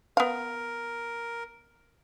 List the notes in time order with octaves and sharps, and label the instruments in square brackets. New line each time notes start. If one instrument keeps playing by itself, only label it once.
[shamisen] B3 F5 [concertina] A#4